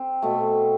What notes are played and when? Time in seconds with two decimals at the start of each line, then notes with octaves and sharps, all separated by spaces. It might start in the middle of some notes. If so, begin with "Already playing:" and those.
Already playing: C4
0.22 B2 A3